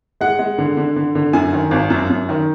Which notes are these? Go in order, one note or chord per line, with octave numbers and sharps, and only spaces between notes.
G#3 F#5
G#3
D3
D3
D3
D3
F#2 G#5
D#3
G#1
F#2
F#2
D#3